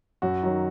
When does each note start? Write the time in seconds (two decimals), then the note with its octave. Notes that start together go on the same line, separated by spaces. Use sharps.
0.22 F#2 F#4
0.43 D#3 F#3